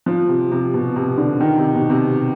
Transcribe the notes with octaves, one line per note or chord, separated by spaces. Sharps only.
F3
C3
C3
B2
C3
D3
D#3
C3
B2
C3